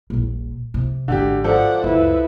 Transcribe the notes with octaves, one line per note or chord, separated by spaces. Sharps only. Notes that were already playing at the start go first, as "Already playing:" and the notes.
D#1 A#1
C3
G#1 G#2 D3 G4
F3 A4 D5 F#5
C#2 F#2 E4 B4